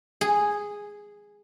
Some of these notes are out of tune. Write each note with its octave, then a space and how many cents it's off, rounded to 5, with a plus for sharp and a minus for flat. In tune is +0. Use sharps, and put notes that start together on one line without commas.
G#4 -5